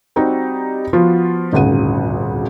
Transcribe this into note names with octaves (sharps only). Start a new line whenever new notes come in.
G3 C4 D#4 F#4 G4
F3 B3 F4 F#4
D#1 G#1 D2 C#3 F#5 D#7